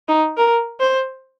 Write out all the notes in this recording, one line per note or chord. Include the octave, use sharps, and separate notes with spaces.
D#4
A#4
C5